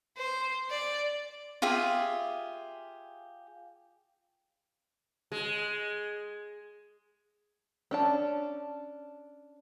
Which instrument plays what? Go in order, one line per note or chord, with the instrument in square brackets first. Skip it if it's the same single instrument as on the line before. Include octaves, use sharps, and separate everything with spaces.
[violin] C5
D5
[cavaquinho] F4 G4 G#4 E5
[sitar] G#3
[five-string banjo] C#4 D4 A5